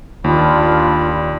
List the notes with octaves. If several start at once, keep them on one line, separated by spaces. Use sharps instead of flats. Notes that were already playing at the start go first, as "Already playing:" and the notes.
D#2 D4 F4 B5